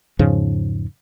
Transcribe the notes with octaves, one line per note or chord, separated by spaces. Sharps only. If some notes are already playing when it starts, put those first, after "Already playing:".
E2 G#2 C#3 F3